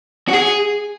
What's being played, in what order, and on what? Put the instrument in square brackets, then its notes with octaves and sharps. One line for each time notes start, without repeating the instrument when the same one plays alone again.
[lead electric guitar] F#4
G#4